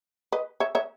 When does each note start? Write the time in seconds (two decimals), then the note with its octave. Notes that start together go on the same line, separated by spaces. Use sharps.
0.32 B4 D#5
0.60 C#5 E5
0.75 C#5 E5